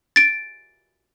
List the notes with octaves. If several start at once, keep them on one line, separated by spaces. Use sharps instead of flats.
A6 D7